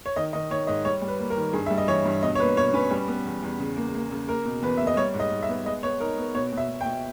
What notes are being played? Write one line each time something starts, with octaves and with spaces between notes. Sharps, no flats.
C#5
D#3 D#5
D#3 D#5
D#3 C#5
G#2 D#5
G3 C#5
G3
B4
A#3
A#4
D#3
G2 G#4
G3 E5
D#5
E3 C#5
G2
B2 D#5
C#5
A#3 B4
B2 C#5
C#4 B4
G3
B3
E2
E2
C#3
A#3
A#3
C#3
A#3 A#4
B2
E2 B4
A#3 E5
D#5
G3 C#5
G#2
D#5
G#2
E5
B3
G#3 D#5
B3 C#5
D#4 A#4
B3
B2 C#5
B2
E5
B2
G5
B2